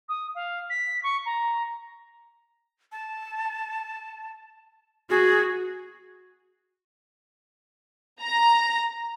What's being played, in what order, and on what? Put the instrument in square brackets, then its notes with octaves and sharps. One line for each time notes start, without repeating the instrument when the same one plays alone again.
[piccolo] D#6
F5
B6
C#6
A#5
[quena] A5
[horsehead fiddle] F#4 [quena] G#4
[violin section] A#5